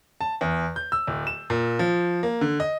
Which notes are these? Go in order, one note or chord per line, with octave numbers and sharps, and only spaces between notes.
A5
E2
G6
E6
D1
E7
A#2
F3
A#3
D3
D#5